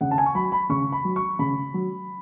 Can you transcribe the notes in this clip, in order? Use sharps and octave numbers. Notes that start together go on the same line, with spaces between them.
C#3 F#5
A5
G#5
C#6
F#3 B5
B5
C#3 C#6
B5
F#3
C#6
C#3 B5
F#3